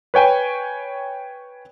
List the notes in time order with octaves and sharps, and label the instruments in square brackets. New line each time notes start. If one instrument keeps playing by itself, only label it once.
[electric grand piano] B4 C#5 G5 G#5